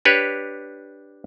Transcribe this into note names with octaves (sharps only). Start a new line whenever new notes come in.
D4 G4 B4 C#5